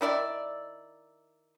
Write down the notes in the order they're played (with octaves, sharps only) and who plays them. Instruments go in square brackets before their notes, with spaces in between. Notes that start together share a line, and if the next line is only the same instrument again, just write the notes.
[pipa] D#3 E4 D5 E5